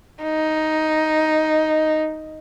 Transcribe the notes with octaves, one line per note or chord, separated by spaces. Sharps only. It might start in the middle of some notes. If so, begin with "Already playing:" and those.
D#4